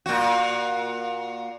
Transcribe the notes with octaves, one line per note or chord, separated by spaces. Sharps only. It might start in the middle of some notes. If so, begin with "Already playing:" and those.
A#2 F#4